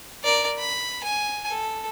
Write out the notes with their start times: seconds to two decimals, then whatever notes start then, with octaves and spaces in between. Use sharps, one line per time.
0.24 A#4 D5
0.59 B5
1.03 G#5
1.48 A4